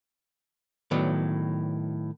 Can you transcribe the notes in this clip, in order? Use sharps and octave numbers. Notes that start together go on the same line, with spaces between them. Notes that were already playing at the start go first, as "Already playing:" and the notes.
A2 D#3 F#3 B3 D5